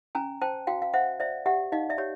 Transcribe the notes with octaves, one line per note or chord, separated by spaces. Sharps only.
C#4 G#5 A#5
C5 G5 A5
F#4 F5 G5
F5
C5 E5 F#5
C5 D5 E5
G4 E5 F#5
D#4 D#5 F5
D5 E5
G4 C#5